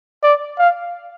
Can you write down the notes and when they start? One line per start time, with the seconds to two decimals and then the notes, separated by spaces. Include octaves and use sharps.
0.23 D5
0.58 F5